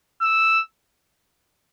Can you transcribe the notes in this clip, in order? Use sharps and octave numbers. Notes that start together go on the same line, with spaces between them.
E6